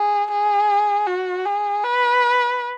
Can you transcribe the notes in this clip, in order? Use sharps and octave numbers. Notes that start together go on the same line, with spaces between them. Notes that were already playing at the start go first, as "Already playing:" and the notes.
Already playing: G#4
G#4
F#4
G#4
B4